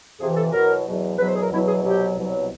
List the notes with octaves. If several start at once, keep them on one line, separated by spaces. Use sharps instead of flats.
F2 C3 E3 G#4
A4
E2 B2 F#3 A#4
E2 B2 F#3
E2 B2 F#3 B4
C5
G#4
A#4
E2 B2 F#3 E4
G#4
C2 B2 F#3 G4
C2 B2 F#3